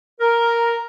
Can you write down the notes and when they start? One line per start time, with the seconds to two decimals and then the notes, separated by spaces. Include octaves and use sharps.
0.20 A#4